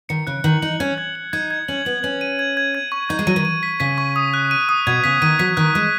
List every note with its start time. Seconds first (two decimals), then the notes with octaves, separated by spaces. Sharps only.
0.09 D#3 C#7
0.27 C#3 F#6
0.44 D#3 F#7
0.62 D#4 F#7
0.80 C#4 G#6
0.98 G#6
1.15 F#7
1.33 D#4 G#6
1.51 G#6
1.68 C#4 F#7
1.85 B3 F#7
2.03 C#4 F#7
2.21 D#7
2.39 G#6
2.57 G#6
2.75 G#6
2.92 C#6
3.09 D#4 G#6
3.19 G#3
3.27 F#3 D#7
3.36 D#3
3.45 D#7
3.63 B6
3.80 C#3 B6
3.98 C#6
4.16 D#6
4.34 F#6
4.51 D#7
4.69 D#6
4.87 B2 G#6
5.04 C#3 B6
5.22 D#3 D#7
5.39 F#3 B6
5.57 D#3 F#6
5.75 G#3 F#6